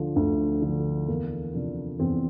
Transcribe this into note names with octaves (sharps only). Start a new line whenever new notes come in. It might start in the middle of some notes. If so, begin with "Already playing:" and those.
Already playing: D2 D3 F3
D2
D3
F3
E2 A#3
C3 F3 D4
E2 C4